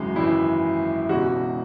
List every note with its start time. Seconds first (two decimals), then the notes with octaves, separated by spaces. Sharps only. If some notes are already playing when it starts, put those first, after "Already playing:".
Already playing: G#1 F#2 C#3 E3 F#3 G#3
0.16 G#1 F#2 C#3 E3 E4
1.09 E1 E2 C#3 F#4